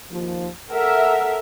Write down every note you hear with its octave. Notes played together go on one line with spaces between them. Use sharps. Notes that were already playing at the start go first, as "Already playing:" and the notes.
D#2 F3
A4 A#4 E5 F#5